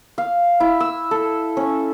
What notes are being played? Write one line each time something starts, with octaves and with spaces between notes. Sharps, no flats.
F5
E4
E6
A4
C#4